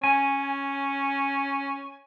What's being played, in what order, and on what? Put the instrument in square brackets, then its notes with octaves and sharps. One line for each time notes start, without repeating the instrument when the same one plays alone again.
[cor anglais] C#4 [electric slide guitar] G#5